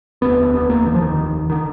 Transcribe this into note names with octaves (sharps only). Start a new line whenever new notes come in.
F1 D#2 D3 B3
B3
A#3
D#3
F3
D#3
D3 D#3